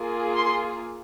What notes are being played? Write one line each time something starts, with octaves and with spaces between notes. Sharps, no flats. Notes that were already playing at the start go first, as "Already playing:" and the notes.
Already playing: A#3 F4 G#4
C6